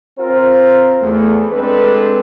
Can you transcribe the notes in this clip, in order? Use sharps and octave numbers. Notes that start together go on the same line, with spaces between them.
C4 F4 A#4 C5
E2 A3
G#3 C4 D4 A4 B4